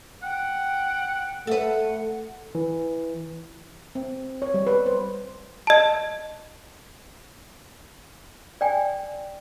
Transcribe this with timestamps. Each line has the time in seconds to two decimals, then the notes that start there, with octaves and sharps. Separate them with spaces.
0.23 F#5 G5
1.47 A3 A4 B4 F#5
2.55 E3
3.95 C4
4.42 C#5
4.54 G3
4.67 B4
4.86 C5
5.67 D#5 A5
8.61 D5 G5 G#5